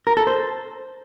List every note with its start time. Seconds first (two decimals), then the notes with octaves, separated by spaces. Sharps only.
0.07 A#4
0.17 A4
0.27 C5